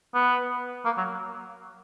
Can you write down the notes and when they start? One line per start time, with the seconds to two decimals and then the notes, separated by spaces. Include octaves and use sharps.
0.14 B3
0.85 A#3
0.97 F#3